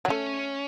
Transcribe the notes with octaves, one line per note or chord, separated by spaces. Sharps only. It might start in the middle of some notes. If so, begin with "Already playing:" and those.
F#3
A3 C#4